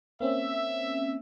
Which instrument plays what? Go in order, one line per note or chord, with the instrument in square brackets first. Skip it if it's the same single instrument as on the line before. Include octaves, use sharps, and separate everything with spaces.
[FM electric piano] A#3 C4 C#4 [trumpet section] E5